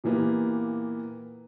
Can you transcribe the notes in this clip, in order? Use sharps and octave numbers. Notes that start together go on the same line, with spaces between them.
A#2 E3 A#3 B3 G4